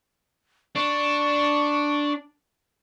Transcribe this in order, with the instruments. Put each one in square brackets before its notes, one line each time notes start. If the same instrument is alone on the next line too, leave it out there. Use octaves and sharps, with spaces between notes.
[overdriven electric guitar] D4 [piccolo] C#6